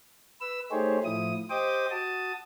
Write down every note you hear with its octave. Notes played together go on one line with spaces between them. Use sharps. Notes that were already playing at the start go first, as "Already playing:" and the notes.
B4 E6
A3 D#4 G4 G#4 C5 C#5
A2 F3 E4 D#6
G4 C5 D#5 G5 D6 D#6
F#4 A5 D#6